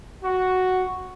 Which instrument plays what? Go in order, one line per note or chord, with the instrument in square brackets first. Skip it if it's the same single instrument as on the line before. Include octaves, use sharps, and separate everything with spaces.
[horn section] F#4